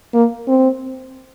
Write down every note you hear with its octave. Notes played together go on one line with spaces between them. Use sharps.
A#3
C4